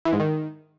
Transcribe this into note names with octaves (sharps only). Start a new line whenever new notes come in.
E3
G#2
D#3